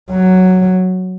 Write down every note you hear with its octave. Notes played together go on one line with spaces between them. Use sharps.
F#3